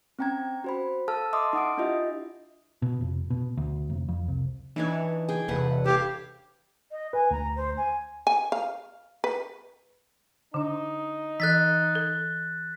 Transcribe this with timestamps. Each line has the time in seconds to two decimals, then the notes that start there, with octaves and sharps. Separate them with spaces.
0.19 C4 C#4 G5 A#5 G#6
0.64 F#4 C5 B5
1.08 A4 F5 A5 E6 F6
1.33 D#5 E5 A5 C6 D6 D#6
1.53 D#4 F#5 D#6 D7
1.77 D4 E4 F4 G4 D#5 E5
2.82 B2
3.01 F1
3.30 B2
3.57 D2
3.90 F1
4.08 F2
4.28 C2
4.76 E3 D4 D#4 C#5
5.28 G#4 G5
5.48 E1 C3 E3 A4 B4 F#5
5.86 G4 A4 C#5 F5
6.91 D#5
7.13 B4 G#5
7.31 D2 A#5
7.56 C5
7.77 G#5
8.27 G#5
8.52 F5
9.24 B4
10.54 D3 D4 D#4
11.40 E3 A4 F#6 A6 B6
11.95 A4